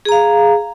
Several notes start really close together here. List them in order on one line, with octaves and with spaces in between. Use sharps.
G#4 A#5 F5